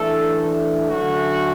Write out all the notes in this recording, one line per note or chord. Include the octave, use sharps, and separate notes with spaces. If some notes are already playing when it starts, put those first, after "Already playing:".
Already playing: E3 A3 D4 A4
D3 F#3 A3 C#4 F#4